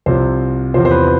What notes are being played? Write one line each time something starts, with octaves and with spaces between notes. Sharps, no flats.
C2 C3 F3 C5
E2 C3 F3 C5
C5
B4